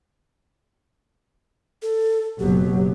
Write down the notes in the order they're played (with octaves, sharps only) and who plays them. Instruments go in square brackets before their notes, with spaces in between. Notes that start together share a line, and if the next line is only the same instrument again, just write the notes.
[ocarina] A4
[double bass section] F#1 B2 F#3 [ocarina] G4